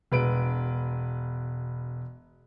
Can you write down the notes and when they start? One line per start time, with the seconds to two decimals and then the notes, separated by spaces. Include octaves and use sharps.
0.12 E1 B4 D7